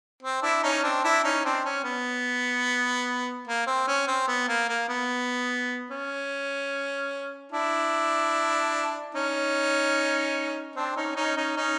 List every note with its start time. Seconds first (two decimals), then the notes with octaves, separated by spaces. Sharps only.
0.23 C4
0.42 D4 E4
0.63 C#4 D#4
0.83 C4 D4
1.03 D4 E4
1.24 C#4 D#4
1.45 C4 D4
1.65 C#4
1.84 B3
3.47 A#3
3.67 C4
3.88 C#4
4.07 C4
4.28 B3
4.48 A#3
4.69 A#3
4.89 B3
5.90 C#4
7.52 D4 E4
9.14 C#4 D#4
10.76 C4 D4
10.96 C#4 D#4
11.16 C#4 D#4
11.37 C#4 D#4
11.57 C#4 D#4